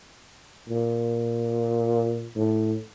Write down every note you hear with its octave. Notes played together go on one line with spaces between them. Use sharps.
A#2
A2